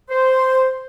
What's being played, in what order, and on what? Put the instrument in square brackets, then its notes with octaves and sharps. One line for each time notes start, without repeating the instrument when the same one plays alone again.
[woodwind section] C5